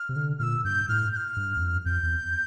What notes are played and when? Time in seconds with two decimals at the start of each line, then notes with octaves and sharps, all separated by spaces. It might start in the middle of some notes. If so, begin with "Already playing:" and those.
Already playing: F6
0.09 C3
0.16 D3
0.40 A#2 E6 F6
0.64 G2 G6
0.89 A2 F6
1.13 G6
1.17 F6
1.37 G2
1.57 E2
1.61 F2
1.85 F2 G6
2.03 E2